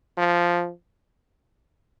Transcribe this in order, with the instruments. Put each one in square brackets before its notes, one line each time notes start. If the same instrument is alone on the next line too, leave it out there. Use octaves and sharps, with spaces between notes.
[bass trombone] F3